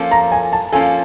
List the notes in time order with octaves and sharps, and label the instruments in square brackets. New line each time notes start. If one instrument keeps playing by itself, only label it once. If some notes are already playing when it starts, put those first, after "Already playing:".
Already playing: [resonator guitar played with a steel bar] F3 A#3 C#4 F4 A4
[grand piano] A#5
G#5
A5
[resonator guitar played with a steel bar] F3 A#3 C#4 F4 A4 [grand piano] G#5